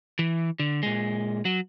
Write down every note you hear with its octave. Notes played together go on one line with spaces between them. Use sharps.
E3
D3
A#2 G#3
F#3